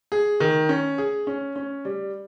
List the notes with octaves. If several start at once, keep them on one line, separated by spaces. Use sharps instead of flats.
G#4
D#3
C#4
G#4
C#4
C#4
G3